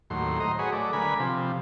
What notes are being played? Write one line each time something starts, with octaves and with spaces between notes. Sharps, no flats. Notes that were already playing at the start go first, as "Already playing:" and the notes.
D#2 A2 F#3 C6
C5 D#5 A#5
F#4 G#4 B4 C#5 D#5
F#3 A3 D5
D3 A#4 B4 G#5 B5
C3 F3